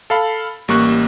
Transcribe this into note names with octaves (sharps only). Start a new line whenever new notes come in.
A4 F5 B5
A1 G3 A#3 C#6 F#6